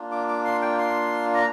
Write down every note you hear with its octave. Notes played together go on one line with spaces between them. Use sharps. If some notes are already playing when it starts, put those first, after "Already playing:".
Already playing: A#3 D4 F4
D6
D6
C6
G5
C6
A#5